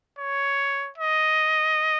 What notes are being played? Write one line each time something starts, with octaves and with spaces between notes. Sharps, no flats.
C#5
D#5